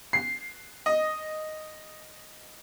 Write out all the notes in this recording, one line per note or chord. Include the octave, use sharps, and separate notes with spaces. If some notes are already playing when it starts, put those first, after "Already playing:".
C7
D#5